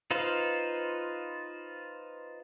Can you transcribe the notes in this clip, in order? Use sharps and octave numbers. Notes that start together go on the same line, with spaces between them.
D#4 F4 B4 C5 F5